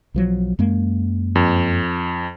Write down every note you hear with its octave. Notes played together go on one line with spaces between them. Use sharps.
B1 F3 F#3
F#2 G#3 A#3
F2